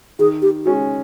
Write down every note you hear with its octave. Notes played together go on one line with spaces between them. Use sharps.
D#3 G#4
G4
G#3 C#4 F#4